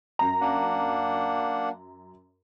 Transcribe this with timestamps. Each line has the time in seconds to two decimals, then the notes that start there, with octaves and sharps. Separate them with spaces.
0.19 F#2 A#5
0.41 A#3 D4 F#5